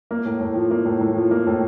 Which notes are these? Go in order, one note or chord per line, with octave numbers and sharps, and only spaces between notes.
A#3
A2
A2
F3
A#3
A2
A2
F3
A#3
A2